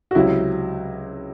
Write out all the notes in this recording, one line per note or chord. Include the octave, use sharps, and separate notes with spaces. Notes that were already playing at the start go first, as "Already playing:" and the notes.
F#4
C#2 C3 F#3 E4